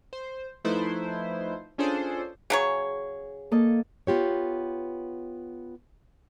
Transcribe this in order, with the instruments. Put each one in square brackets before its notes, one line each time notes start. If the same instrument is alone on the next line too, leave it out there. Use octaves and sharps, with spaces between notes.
[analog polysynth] C5
F3 A3 D#4 E4 B4 C5
C#4 D4 F4 G#4 A4 C5
[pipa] C#3 F#3 C#5 [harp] G#4
[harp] A#3 A4 D#5
[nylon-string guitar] B3 F4 G4 C#5